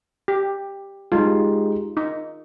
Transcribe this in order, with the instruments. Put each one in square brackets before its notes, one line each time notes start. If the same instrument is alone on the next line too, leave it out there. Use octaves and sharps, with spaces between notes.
[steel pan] G4
[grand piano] G#3 D#4 G4 [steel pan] F4
[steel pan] D#4